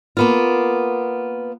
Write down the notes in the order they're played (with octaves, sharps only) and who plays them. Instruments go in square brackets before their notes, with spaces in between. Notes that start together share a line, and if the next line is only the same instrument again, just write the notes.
[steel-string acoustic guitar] A#3 B3 F4